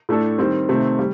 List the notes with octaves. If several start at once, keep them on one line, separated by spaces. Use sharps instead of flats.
A2 A3 D4 A4
D#3 G3 C4
C3 D#3 A3 C4
G3